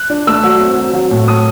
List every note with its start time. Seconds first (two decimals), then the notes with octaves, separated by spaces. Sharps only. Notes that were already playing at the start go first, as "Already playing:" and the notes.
Already playing: F#6
0.10 D4
0.27 A3 E6
0.43 F#3
0.60 C4
0.77 F#3
0.93 F#3
1.11 A2
1.28 A3 D#6